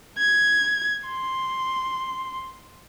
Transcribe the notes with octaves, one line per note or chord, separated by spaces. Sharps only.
G#6
C6